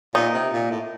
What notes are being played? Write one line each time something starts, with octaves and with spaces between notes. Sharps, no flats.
A#2 D#4
C3
A#2
A2